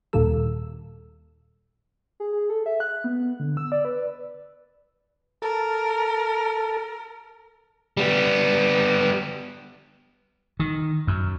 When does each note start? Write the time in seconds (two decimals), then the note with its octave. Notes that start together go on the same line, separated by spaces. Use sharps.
0.13 D#2 A#2 D#3 G3 A4 E6
2.20 G#4
2.33 G#4
2.50 A4
2.66 E5
2.80 F#6
3.04 B3
3.40 D3
3.57 E6
3.72 D5
3.85 B4
5.42 A4 A#4
7.97 G3 B3
10.60 D#3
11.07 F#2